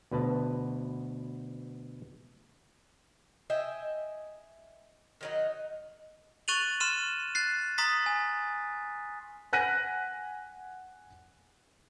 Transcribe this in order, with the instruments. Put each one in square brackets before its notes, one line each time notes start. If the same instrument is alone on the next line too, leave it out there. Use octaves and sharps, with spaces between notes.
[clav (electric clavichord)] D2 B2 B4 A5
[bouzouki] D#5 E5 G5 G#5
D#3 F#3 D#4
[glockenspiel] C#6 F#6 A6 D#7 F7 F#7
C6 F6 D#7 E7
F#6 A6 C7
A#5 C6 D#6 A6 B6
G#5
[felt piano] F#5 G#5 F#6 A#6 B6 D#7